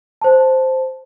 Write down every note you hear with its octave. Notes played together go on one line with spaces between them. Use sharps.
C5 A5